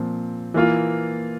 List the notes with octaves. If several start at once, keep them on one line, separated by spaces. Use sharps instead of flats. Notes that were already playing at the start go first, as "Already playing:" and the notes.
Already playing: A#2 F3 C4
E3 A#3 F4